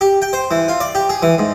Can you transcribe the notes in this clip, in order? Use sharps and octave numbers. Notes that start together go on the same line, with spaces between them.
G4
G5
C5
E3
F4
D5
G4
G#4
E3
G#2